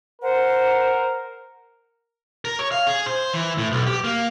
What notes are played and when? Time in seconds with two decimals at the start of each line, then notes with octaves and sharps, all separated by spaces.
0.22 A#4 C5 F#5
2.45 A#4
2.59 C#5
2.72 F5
2.87 G#4
3.06 C5
3.33 E3
3.58 A2
3.72 B1
3.87 G4
4.04 A#3